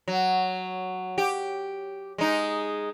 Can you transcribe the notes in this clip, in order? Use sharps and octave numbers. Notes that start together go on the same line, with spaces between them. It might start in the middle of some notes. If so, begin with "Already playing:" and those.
F#3
G4
G#3 D#4